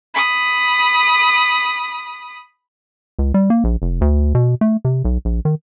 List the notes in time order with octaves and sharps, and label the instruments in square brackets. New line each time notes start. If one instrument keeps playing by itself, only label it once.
[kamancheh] B5 D#6
[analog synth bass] C#2
G3
A#3
A#1
F1
D2
B2
A3
C3
B1
A#1
D#3